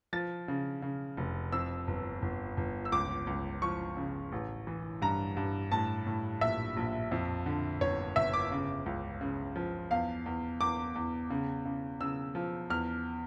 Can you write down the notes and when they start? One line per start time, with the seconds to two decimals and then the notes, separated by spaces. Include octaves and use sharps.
0.13 F3 A6
0.48 C#3
0.82 C#3
1.17 F1
1.52 F2 E6
1.87 G1
2.22 G1
2.57 G1
2.85 E6
2.92 C#2 D6
3.27 C#2
3.62 F3 C#6
3.97 C#3
4.32 A1
4.67 E3
5.02 G2 A#5
5.37 G2
5.72 A2 A5
6.07 A2
6.41 A#1 E5
6.77 A#1
7.11 F2
7.46 D3
7.81 G1 C#5
8.16 G1 E5
8.34 D6
8.51 C#3
8.86 C#2
9.21 C#3
9.56 F3
9.91 E2 F5
10.26 E2
10.61 E2 D6
10.95 E2
11.30 C#3
11.65 C#3
12.01 C#3 E6
12.35 F3
12.70 E2 F6